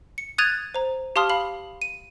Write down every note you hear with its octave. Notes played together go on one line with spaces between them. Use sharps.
C#7
D#6 F#6 G#6 A6 D#7 F7
C5 A#5
G4 F5 A5 C6 D#6 F6
F5 B5 F#7
D#7